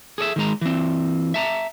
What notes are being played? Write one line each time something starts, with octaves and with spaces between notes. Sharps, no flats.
G#4 A4 D5 E5
D#3 G#3 A#5
E3 C4
E5 A5 A#5